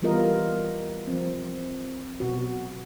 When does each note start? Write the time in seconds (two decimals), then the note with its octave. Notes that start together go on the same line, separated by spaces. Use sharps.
0.02 E3 G3 B3 F4 A#4 D#5
1.07 F3 C4
2.20 B2 F#4